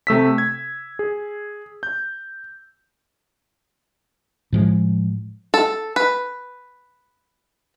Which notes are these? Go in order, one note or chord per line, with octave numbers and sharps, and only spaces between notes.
C3 A3 E6 B6
G#6
G#4
G6
A2 F3 G#3
A4
B4